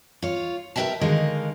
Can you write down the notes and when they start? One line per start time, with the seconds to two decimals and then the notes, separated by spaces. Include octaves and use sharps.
0.22 F4 C#5
0.76 A#4 B4 D#5 E5 G5 A5
1.01 D3 D#3 G#3 A#4 D#5 F5